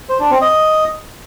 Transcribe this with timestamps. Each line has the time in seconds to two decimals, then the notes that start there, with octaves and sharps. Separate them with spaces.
0.09 C5
0.20 D4
0.31 C4
0.42 D#5